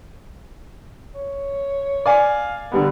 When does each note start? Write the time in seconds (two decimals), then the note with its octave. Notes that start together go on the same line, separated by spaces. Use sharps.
1.15 C#5
2.06 D5 F5 G#5
2.72 D3 G3 B3 A#4